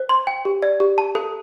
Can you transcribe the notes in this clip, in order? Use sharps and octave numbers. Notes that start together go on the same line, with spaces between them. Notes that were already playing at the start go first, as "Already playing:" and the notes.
Already playing: C5
C6
G5
G4
D5
G4
A5
A4